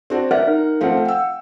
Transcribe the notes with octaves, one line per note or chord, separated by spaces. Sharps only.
C4 D4 F#4
A#4 D5 E5 F#5
D#4 A#4
F3 A3 C4 F5 F#5
G5 E6